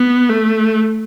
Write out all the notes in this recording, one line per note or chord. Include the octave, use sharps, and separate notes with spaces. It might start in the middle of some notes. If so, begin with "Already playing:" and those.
Already playing: B3
A3